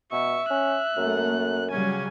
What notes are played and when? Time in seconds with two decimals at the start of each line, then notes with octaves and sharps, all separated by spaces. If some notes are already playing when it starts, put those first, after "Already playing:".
0.12 B2 E5 C#6
0.50 C#4 F#6
0.97 F#2 A3 A#3
1.72 C#3 F#3 G3 C#4 G#5